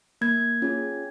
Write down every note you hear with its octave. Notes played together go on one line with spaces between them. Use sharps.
A#3 G#6
C#4 F4 G#4